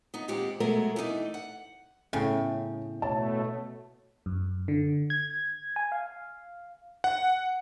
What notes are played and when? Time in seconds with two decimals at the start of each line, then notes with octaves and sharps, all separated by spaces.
0.14 B3 D#4
0.28 D#2 A#2 G#3 C4 G4 F#5
0.60 B2 F#3 G#3 A3 B3 A#4
0.96 E3 A3 D#4 D5
1.34 F#5
2.13 A2 C#3 B3 G5
3.02 B2 A3 C#5 A5
4.26 F#2
4.68 D3
5.10 G#6
5.76 G#5
5.92 F5
7.04 F#5